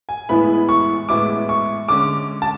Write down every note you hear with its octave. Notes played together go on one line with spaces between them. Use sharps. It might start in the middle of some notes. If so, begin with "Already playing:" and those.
G#5
A2 E3 G#3 B3 E4 B5
C#6
A2 E3 G#3 B3 E4 D6
C#6
D3 G#3 C#4 D6
A5